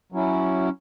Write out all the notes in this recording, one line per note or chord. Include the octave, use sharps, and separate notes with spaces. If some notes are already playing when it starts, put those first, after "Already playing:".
F#3 C#4 E4